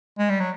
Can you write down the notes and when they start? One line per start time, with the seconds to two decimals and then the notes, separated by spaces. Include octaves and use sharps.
0.19 G#3
0.30 G3
0.40 F#3